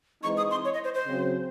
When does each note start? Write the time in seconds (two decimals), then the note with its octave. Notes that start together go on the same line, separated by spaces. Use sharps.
0.23 E3 G#3 C4 D#4 C#6
0.37 D#6
0.51 C6
0.65 C#5
0.74 D#5
0.84 C5
0.95 C5
1.06 C#3 F#3 C4